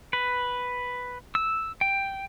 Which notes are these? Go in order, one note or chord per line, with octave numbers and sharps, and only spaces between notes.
B4
E6
G5